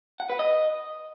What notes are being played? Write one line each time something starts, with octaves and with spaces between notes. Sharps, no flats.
F#5
B4
D#5